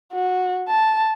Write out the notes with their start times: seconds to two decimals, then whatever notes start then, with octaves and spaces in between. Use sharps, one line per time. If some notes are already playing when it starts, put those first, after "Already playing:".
0.13 F#4
0.68 A5